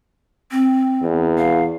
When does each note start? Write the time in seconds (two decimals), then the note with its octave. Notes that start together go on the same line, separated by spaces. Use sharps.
0.51 C4
1.02 E2
1.38 F5